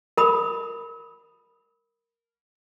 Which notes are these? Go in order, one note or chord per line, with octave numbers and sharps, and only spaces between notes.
A#4 B5 D#6